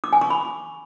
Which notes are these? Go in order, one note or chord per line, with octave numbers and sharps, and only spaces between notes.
D6
G#5
C#6
B5